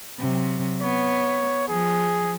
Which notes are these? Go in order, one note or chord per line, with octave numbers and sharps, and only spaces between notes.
C3 F#3
B3 C#5
F3 G#4